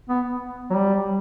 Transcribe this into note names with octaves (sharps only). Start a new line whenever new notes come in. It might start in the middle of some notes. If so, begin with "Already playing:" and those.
B3
F#3
G3